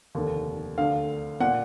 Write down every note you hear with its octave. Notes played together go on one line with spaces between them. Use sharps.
F1 D#2 D3
D2 D3 F5
A#2 F#5